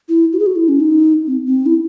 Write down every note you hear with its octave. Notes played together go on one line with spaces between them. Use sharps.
E4
F#4
G#4
F#4
E4
C#4
D#4
C4
C4
E4